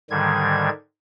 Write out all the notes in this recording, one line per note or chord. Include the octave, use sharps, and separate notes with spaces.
G#2 D3 D#3 G3 G#6